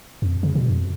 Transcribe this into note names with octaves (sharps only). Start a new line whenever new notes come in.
F2
C#3
B2
F2